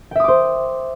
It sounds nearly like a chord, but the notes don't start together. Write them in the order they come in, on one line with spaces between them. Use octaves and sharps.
G5 E5 D#6 D6 C5